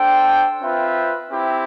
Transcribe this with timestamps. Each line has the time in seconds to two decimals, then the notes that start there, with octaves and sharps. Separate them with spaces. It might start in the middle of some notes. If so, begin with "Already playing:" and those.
Already playing: D4 A4 C5 G5
0.62 C4 F4 B4 E5 G5
1.29 C4 E4 G4